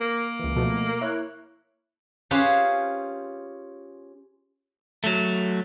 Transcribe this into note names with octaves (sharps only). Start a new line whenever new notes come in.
A#3
C#2 E3
B2 F3 A3
E4 C#5 F#6
C#4 F4 G4 G#4 B4 C5
F#3 A3